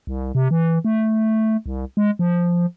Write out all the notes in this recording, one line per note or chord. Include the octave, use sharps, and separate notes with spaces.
C2
C3
E3
A3
C2
G#3
F3